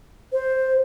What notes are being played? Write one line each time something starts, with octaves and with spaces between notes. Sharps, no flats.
C5